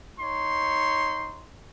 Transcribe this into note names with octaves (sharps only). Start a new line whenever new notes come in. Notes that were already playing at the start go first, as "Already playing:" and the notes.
D#4 C#5 C6